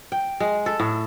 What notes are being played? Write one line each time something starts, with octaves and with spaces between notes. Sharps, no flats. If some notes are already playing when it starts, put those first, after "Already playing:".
G5
G#3
A4
A2